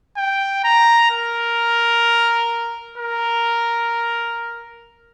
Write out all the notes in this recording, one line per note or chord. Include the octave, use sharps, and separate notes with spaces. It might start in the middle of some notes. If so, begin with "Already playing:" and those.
G5
A#5
A#4
A#4